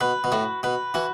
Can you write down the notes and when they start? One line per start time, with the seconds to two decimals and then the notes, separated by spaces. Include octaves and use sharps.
0.01 B2 B4
0.24 B2
0.32 A2 F#4
0.63 B2 B4
0.94 E3 F#4